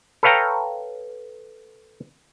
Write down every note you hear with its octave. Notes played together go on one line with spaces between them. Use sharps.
A4 B4 C#5 F5 G5 A#5